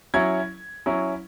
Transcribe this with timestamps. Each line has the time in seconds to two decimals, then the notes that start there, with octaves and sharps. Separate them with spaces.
0.14 F#3 C#4 E4 G#6
0.86 F#3 C#4 E4